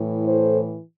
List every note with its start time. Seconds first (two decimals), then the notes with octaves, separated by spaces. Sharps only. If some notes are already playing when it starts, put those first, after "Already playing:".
Already playing: A2 E3
0.27 A4 C5